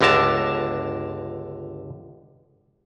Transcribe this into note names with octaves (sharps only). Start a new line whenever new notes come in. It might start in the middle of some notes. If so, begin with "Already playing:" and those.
G1 C#2 D3 A#4 A5